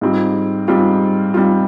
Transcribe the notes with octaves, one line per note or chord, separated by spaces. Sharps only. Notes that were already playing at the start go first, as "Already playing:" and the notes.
G#2 G3 C4 F4
G#2 G3 C4 F4
G#2 G3 C4 F4